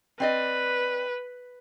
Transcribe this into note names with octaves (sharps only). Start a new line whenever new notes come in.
C4 B4 D5 D#5